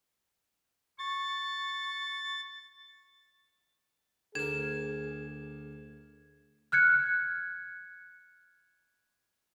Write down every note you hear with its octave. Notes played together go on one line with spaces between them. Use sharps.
C#6 A6
D2 G#4 A#4 G#6 E7
F6 F#6 G#6 C#7